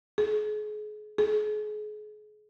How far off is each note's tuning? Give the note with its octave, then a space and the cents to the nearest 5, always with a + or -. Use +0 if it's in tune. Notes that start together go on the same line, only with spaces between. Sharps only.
G#4 +35
G#4 +35